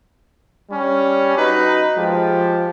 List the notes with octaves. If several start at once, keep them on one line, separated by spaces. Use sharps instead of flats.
G3 C#4
D#4 F#4 B4
F3 G#3 G4